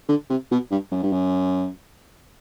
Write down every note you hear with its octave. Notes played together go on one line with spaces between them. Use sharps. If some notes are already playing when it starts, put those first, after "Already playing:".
D3
C3
B2
G2
F#2
G2
F#2